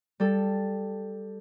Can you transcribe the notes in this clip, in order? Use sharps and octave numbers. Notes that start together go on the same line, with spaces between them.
G3 A4